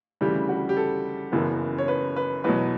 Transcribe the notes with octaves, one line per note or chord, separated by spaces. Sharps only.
D2 C#3 E3 G3 G4
F#4
G4
A4
F#1 F#2 C#3 E3 B3
C#5
B4
B4
E2 B2 F#3 B4